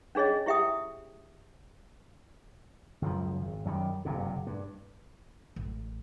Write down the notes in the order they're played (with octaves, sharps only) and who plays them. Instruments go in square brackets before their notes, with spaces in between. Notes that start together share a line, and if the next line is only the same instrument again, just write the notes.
[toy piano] C#4 D4 G#4 C#5 D#5
E4 G4 E5 G5 D#6
[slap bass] C#2 F#2 F3
G#1
F#2 D#3 F3 G3
F#1 G2 C3
G2
[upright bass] A1